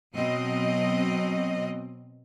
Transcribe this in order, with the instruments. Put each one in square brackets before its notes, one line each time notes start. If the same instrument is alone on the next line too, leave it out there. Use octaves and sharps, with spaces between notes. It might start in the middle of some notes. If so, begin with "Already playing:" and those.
[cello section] B2 F#3 C4 D#5